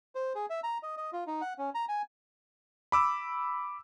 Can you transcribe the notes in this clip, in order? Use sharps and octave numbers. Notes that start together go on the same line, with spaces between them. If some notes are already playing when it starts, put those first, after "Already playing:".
C5
G#4
E5
A#5
D#5
D#5
F4
D#4
F#5
C#4
A#5
G#5
B5 D6 E6